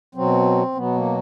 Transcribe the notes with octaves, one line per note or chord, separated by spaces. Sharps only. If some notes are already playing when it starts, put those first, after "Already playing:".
B2 F#3 C4
B2 F#3 B3
A#3